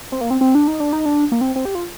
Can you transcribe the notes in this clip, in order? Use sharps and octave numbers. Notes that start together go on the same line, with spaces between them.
C4
A#3
C4
C4
D4
D#4
D4
D#4
D4
A#3
C4
C4
G4
F4